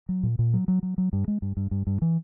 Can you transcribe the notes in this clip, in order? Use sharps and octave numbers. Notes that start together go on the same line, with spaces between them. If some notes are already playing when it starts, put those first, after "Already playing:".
F#3
A#2
A#2
F#3
F#3
F#3
F#3
G2
G#3
G2
G2
G2
G2
E3